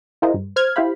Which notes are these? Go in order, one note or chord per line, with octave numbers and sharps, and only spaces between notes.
E4 F4 G#4 A#4 C5 D#5
G2
C5 F6 G#6
E4 G4 C5 F5 B5